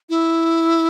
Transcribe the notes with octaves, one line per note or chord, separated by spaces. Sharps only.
E4